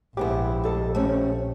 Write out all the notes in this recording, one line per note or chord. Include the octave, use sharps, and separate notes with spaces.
A#1 G#2 B3 E4 G4
D2 A4 D#5
A3 C4 C#4